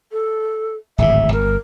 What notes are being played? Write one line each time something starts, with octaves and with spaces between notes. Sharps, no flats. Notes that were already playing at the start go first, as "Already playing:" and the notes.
A4
D1 G#1 A2 E5
G1 A#4